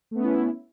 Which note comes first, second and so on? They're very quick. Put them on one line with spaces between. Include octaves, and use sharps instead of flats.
A3 B3 C#4 E4